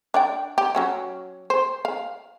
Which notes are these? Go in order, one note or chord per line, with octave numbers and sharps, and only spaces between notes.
D4 D5 G5
G4
F#3 C#4 F#4
C5
F5